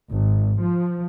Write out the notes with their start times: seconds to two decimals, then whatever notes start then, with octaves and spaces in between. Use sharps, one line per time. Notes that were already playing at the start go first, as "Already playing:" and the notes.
0.12 G#1
0.61 F3